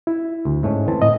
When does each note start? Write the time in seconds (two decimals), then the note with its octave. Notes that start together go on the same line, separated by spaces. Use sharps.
0.07 E4
0.45 D2
0.63 G#2 A3 C#4
0.88 E3 C4 A5
1.02 A2 D#5